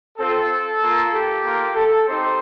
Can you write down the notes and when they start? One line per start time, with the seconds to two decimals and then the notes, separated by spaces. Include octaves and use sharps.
0.19 C4 F4 A4
0.81 A#3 F4
1.13 G4
1.44 A#3 F4
1.75 A4
2.07 C4 D#4 G4 C5